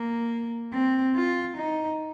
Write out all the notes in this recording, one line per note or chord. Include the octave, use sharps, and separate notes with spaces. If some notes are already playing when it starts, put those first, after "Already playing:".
Already playing: A#3
C4
F4
D#4